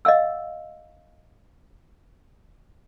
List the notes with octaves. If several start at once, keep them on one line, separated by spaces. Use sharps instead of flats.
D#5 F5 F#5 E6